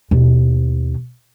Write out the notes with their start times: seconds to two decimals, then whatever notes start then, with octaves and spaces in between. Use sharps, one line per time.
0.11 D#2 B2